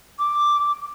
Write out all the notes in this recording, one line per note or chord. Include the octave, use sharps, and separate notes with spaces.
D6